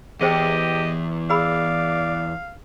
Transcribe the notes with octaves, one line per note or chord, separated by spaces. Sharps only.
E2 G4 G#4 C5 D#5 G5
G#4 D5 F5 B5 E6